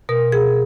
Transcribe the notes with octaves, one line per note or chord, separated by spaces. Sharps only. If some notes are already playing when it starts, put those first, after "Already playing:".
B2 A#4
G#4